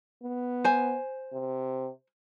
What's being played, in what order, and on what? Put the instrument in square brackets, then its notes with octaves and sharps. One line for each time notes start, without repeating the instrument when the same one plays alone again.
[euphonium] B3
[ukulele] C5 G#5
[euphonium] C3